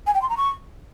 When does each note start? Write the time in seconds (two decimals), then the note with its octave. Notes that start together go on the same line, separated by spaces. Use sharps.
0.07 G#5
0.14 G5
0.22 C6
0.30 A#5
0.37 C#6